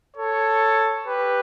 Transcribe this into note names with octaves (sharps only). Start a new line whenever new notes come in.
A4 C#5
G4 B4